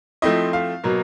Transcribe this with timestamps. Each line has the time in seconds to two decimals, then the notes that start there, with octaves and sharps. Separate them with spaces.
0.22 F3 A3 C4 E4 D#5
0.53 F5
0.84 B2 F#3 A#3